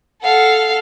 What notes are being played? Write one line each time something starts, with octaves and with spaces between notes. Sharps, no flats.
A4 F5 F#5